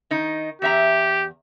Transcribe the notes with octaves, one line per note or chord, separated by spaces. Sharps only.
D#3 D#4
E2 G4 E5 A#5